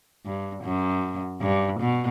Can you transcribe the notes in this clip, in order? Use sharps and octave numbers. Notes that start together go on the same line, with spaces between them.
G2
F#2
G2
B2